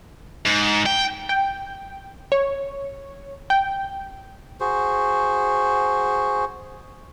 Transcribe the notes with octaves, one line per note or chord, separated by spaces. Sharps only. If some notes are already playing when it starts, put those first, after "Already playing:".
G#2
G5
G5
C#5
G5
F#4 G#4 C5